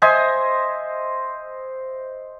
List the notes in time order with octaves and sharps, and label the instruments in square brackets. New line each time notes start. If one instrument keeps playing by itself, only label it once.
[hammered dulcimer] C5 D#5 E5 G#5